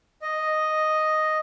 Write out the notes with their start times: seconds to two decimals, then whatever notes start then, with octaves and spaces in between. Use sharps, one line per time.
0.22 D#5